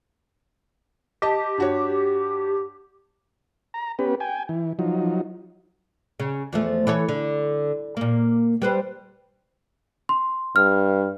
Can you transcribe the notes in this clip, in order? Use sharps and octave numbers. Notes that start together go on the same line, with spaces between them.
G4 D#5 A5
G2 F#4 C#5
A#5
B3 C#4 G4 B4
G5 G#5
E3
F3 F#3 D#4
C#3
E2 F3 A3
E3 A4 C#5
D3
A#2 A#3
G3 B4 C5
C6
G2 F6